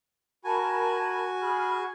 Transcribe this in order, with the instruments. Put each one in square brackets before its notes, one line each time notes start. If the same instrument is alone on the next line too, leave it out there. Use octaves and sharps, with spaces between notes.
[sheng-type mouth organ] F#4 G#5 [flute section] A#4 A5 B5
[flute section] G#4 B5 F6